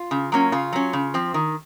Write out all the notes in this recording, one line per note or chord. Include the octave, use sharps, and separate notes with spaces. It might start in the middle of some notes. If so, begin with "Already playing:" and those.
Already playing: F4
C#3
F#3 A#3 C#4
C#3 F4
F#3 C#4
C#3
F3 C4
D#3